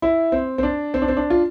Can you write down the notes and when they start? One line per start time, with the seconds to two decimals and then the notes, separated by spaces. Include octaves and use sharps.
0.02 E4
0.32 C4
0.58 C4
0.63 D4
0.94 C4
1.02 D4
1.08 C4
1.17 D4
1.30 F4